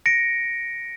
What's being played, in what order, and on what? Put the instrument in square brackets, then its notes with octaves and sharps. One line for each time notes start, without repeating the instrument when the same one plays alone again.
[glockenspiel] A#6 C#7 D7